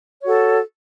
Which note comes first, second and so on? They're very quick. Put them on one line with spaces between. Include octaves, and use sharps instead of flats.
C#5 F#4 A4